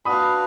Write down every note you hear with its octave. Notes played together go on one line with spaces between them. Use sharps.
D4 F#4 B4 F5 B5 D#6